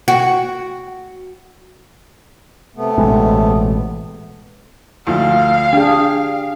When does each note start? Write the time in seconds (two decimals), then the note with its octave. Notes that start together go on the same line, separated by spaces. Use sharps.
0.08 F#4
2.76 C3 A3 B3
2.98 A1 B2 G#3
5.07 D2 F3 F5
5.73 D4 G4 G#4